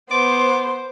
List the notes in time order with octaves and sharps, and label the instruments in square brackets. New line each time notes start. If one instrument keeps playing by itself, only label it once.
[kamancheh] B3 [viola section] C5 [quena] C6 [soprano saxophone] D6